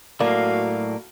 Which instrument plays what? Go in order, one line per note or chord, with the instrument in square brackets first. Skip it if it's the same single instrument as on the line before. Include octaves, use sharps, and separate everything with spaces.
[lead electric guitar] A2 F#3 [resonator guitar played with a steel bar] A#3 [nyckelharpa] F#4 F5 [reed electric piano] D5